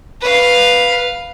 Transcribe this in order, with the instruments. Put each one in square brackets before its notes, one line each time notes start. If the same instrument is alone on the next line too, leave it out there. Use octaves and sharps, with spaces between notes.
[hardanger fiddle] B4 F5